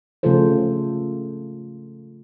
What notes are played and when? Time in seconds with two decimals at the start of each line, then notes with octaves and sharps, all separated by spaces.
0.23 C#3 F3 A3 F4 A4 C5